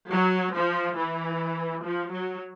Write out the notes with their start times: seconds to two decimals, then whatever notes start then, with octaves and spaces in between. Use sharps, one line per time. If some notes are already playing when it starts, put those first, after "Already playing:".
0.10 F#3
0.54 F3
0.96 E3
1.83 F3
2.11 F#3